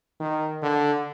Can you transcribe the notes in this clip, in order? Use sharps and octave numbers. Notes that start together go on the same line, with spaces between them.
D#3
D3